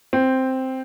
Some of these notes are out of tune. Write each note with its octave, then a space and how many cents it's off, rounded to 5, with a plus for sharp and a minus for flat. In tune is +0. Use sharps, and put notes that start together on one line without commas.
C4 +0